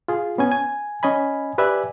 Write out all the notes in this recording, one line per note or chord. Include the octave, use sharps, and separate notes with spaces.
F4 G#4
B3 C#4 G#5
G#5
C#4 D#5 G#5 B5
G4 B4 D5 E5 G#5